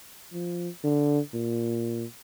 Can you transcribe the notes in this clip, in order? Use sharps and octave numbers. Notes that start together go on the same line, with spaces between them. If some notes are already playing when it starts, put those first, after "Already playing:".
F3
D3
A#2